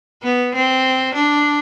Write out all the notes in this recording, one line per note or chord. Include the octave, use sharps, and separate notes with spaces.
B3
C4
D4